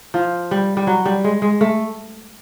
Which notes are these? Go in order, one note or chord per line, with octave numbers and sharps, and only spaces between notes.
F3
G3
G3
F#3
G3
G#3
G#3
A3